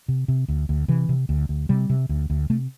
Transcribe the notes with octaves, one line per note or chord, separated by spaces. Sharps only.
C3
C3
D2
D2
C3 E3
C3
D2
D2
C3 G3
C3
D2
D2
C3 A3